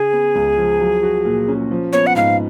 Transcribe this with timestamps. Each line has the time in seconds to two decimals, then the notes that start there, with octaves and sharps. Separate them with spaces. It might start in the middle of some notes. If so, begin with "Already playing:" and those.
Already playing: C#3 G#4
0.12 B3
0.35 C#2
0.57 F3
0.80 F#3
1.03 F#4
1.25 A#2
1.48 C#4
1.71 F3
1.93 B3 C#5
2.07 F#5
2.15 G#2 F5